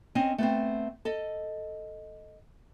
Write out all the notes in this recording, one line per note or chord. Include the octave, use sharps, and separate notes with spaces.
C4 C#4 D#5
A3 B3 C4
A4 D#5